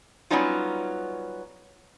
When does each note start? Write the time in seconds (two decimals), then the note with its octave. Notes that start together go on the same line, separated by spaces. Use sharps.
0.30 F#3 G3 B3 C#4 D#4 F4